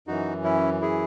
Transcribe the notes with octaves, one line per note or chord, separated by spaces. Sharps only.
F#2 E3 D#4 F#4
C#4 E4
E4 G#4